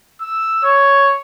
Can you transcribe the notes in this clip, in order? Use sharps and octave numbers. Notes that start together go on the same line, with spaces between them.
E6
C#5